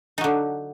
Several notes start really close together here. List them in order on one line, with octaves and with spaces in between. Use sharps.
D#4 F#3 D3